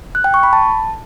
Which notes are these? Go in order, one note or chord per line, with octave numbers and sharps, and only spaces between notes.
F#6
G5
C#6
B5
A5